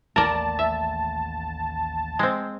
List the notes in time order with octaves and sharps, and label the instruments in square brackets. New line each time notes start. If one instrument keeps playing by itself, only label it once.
[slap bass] A1 D#2 A3 [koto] A#4 D5 [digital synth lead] A5
[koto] E5
G#3 C4